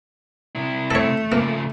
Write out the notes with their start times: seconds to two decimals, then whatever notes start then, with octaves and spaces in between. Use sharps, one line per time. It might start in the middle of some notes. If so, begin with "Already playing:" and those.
0.55 C3 E4
0.90 A3 A4 C#5
1.32 C#3 F3 A#3